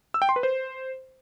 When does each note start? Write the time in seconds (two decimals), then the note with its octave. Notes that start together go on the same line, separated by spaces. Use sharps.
0.14 E6
0.22 G5
0.29 C6
0.36 B4
0.43 C5